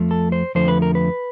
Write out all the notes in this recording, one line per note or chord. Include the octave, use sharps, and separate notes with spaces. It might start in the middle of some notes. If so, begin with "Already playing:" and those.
Already playing: F2 F3 A3
A4
C5
F2 D3 F3 A3 C5
B4
A#4
B4